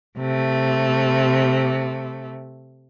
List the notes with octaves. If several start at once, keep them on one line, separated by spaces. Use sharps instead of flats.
C3 A3